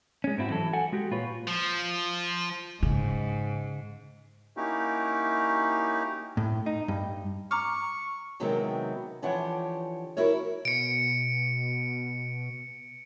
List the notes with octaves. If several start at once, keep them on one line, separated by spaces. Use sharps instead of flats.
G#3 C#4
G#2 C4 D4 E4 F#4
E3 F#3 E4 A4
A4 F#5 G#5
G#3 F#4 G4
A#2 F4 B4 C#5
F3
G#2 C#3
A#3 C#4 D#4 E4 F#4 G4
A2
D#4
G2
A#5 C#6 D6 F6
C3 D#3 F#3 G#3 B3 C4
D3 E3 F3 G4 C#5 F#5
E4 F#4 A#4 C#5
B2 C#7 D7